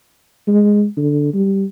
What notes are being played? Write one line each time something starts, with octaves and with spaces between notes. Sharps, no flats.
G#3
D3
G3